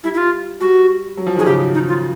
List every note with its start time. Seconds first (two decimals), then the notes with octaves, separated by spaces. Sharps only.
0.04 G3 E4
0.14 E4
0.17 F4
0.60 G3 F#4
1.17 F#3
1.27 F3
1.36 D#3 G#4
1.46 C#3 G4
1.74 D#4
1.88 F4